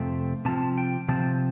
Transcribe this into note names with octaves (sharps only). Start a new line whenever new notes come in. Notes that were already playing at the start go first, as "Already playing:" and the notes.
Already playing: F2 C3 A3 C4
C3 F3 C4 A5
G5
C3 F3 C4 A5